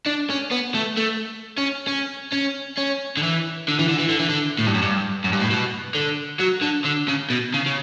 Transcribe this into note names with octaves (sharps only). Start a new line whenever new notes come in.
D4
C#4
B3
A3
A3
C#4
C#4
C#4
C#4
D3
E3
D3
E3
D3
E3
D3
E3
D3
A2
G2
F#2
G2
F#2
G2
A2
B2
D3
F#3
D3
D3
C#3
B2
C#3
C#3